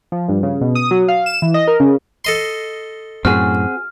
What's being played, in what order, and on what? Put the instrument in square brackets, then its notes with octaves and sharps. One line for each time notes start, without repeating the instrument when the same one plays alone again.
[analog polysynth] F3
G2
C#3
B2
D#6
F#3
F5
E7
E3
D#5
A#4
C#3
[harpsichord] A4 D#5 C6
[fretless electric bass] F#2 A2 [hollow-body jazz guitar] C4 F#4 G#4 [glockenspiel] F6